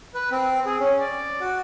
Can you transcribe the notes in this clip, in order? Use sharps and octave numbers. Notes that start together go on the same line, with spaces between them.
B4
C4
G#4
C#4
D5
F#4